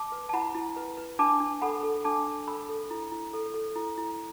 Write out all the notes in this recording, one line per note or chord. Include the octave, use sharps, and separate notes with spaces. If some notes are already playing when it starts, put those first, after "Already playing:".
Already playing: A5 D6
B4
A5
E4 F#5 B5
E4
B4
B4
D4 A5 D6
D4
A4 F#5 B5
A4
D4 A5 D6
D4
A4 B5 E6
A4
E4
E4
A4
A4
E4
E4